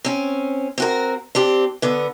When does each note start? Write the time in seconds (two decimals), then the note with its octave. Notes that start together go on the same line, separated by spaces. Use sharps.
0.04 C4 C#4
0.78 C4 F#4 A#4
1.35 C4 D4 G4
1.82 D3 B3